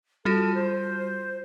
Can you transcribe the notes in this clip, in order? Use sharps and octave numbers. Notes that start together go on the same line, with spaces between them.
G3 F4 F#4 A4
C5